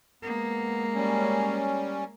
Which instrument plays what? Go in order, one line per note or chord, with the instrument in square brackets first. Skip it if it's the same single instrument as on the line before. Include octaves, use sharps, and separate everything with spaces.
[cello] G#3 A#3 [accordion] B3
[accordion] G3 C#4